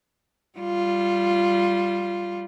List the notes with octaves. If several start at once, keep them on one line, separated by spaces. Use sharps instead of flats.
G3 F4